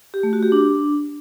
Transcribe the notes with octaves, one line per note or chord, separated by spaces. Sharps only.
G4
A3
F#4
G4
D4